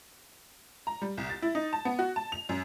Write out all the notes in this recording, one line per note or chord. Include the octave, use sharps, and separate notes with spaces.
A#5
G3
C2
A6
E4
D#4
A5
B3
F#4
A5
F7
F#2